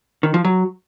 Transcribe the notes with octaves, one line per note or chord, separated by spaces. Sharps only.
D#3
F3
F#3